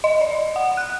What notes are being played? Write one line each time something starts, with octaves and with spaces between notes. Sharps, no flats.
D#5
D5
F#5
F#6